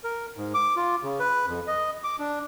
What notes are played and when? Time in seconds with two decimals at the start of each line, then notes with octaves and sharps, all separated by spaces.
0.04 A#4
0.37 G#2
0.54 D6
0.76 F4
1.03 C#3
1.20 B4
1.47 F2
1.67 D#5
2.04 D6
2.19 D4